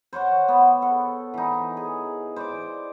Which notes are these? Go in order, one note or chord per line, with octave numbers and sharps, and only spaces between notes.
C5 C#5 F#5 C#6
B3
A4
E3 D#4
G#4
C5 D5 D6